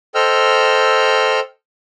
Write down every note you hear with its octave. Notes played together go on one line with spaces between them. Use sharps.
A4 C5 D#5 G5 E6 F6